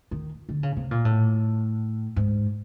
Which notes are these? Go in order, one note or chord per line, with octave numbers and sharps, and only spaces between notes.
D#3
D3
C#3
C3
A#2
A2
G#2